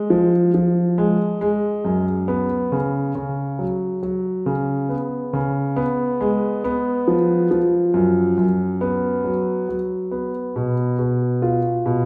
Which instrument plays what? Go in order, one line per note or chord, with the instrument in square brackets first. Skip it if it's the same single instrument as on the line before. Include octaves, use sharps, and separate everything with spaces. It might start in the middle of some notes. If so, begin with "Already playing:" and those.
Already playing: [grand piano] G#3
F3
F3
G#3
G#3
F#2
B3
C#3
C#3
F#3
F#3
C#3
B3
C#3
B3
G#3
B3
F3
F3
F#2
F#2
B3
F#3
F#3
B3
B2
B2
F4
B2